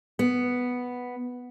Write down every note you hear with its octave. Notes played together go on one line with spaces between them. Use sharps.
B3